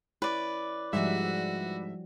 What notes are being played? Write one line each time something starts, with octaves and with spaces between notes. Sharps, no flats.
E4 B4 C#5 D5
G#2 F3 G3 F#4 E5